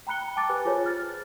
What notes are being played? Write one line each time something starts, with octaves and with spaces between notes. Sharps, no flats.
G5 A#5 B5 F#6 C#7 G7
G5 A5 D6 A6
G4 B4 G#5 F#6
F4 G#4 C5 C#5
F6 A6